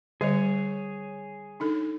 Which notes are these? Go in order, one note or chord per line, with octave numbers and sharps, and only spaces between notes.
D3 G3 G#4 C#5 D#5
D4 D#4 A4